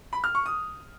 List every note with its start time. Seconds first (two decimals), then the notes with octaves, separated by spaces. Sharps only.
0.13 B5
0.24 F6
0.35 C#6
0.46 D#6